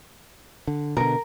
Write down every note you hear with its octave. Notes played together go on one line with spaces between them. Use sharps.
D3
B2 D3 A#4